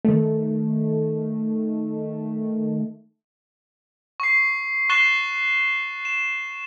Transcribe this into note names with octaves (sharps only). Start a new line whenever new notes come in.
D#3 A3
C#6 C7
C#6 F#6 A6 C7 E7 G7
E7